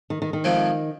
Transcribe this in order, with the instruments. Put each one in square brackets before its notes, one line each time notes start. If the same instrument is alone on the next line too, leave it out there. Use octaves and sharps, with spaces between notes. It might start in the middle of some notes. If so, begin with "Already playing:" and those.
[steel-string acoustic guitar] D#3
D#3
D#3
[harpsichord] F2 C3 F3 G#3 C4